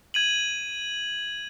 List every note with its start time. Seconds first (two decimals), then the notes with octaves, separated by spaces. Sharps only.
0.14 G#6 D#7 F#7